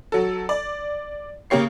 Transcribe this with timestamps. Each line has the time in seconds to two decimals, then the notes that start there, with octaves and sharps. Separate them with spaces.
0.12 F#3 A4
0.49 D5
1.50 C#3 A#3 G4 C#5 C7